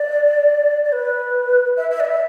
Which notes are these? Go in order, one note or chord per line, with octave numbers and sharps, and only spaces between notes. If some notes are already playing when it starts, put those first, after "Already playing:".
Already playing: D5
D5
B4
E5
E5
D5
E5